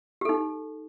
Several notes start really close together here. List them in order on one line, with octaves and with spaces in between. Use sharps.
G4 A4 D#4